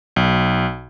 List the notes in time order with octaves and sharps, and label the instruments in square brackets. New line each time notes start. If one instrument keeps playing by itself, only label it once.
[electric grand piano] B1